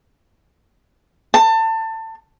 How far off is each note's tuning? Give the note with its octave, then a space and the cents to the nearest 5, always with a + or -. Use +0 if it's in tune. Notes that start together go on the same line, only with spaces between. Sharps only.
A5 +25